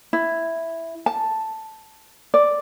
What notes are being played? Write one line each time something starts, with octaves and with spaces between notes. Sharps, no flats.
E4
A5
D5